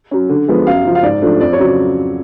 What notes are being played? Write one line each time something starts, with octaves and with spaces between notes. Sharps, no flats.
F#3 C#4
D3
F3 G#3 B3
F#2 F5
C#3 F3
F5
G#2 D5
F3 A3 D4
F2 D5
C#5
C#3 F#3